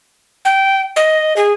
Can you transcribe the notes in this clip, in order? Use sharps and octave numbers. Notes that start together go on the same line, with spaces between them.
G5
D#5
G#4